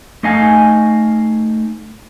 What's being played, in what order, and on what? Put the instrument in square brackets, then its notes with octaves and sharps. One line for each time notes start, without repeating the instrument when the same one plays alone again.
[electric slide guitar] A3 D#4 D#5 F5 G#5